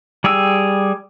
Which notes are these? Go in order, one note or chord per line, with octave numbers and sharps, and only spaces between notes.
G3 G#4 G5 E6